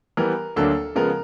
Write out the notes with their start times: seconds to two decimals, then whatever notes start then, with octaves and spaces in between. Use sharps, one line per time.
0.17 E3 G3 B3 A#4
0.56 D2 D3 F#3 A#3 D4 A4
0.96 C#3 F3 G#3 B3 A#4